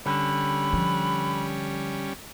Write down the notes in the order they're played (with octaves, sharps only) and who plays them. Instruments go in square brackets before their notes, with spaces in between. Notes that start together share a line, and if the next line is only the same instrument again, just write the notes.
[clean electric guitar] D3 [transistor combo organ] G3 C#4 [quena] B5
[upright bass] F3